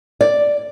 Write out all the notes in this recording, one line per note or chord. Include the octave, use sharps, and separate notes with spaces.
D5